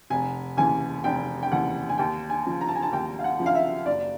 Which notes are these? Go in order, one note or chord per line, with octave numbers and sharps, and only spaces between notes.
F1 G#5
D#2 C#3 E3 G#5
F1 G5
G5
D#2 C#3 E3 F#5
G#5
D#2 G5
G#5
C#3 F3
A#5
A5
G#5
A5
D#2 G5
F5
F#5
C#3 F3
F5
E5
F#1 D5